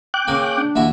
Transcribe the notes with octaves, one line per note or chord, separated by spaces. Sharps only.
G5 D6 F#6
A#3 C#4 G#4
D4
D#2 E4 F#4